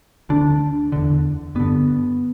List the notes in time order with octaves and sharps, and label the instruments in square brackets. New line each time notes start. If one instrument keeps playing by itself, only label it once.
[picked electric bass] D2 D3 D4
E2 D3
G2 D3 B3